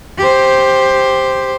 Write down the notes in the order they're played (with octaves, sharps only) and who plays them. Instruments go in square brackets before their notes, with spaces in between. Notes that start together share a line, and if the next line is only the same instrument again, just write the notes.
[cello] G4 C5